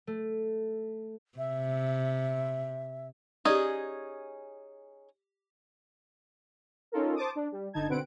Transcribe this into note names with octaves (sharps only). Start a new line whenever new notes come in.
A3
C3 E5
C#4 D#4 G4 G#4 D5
C#4 D#4 F4 A4 A#4
C5 A5 D6 D#6
D4
G3
G1 D3 D#4 A5 G#6
B2 D3 C4 B4 F#5 D7